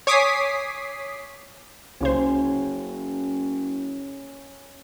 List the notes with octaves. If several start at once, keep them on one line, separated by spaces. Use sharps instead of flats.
C#5 G#5 D6 D#6 B6 C7
F#1 C2 C#3 C#4 C5